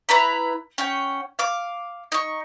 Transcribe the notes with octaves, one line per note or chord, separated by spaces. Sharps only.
E4 B4 A#5 B5
C#4 F#5 G5
F5 D6
D#4 C#6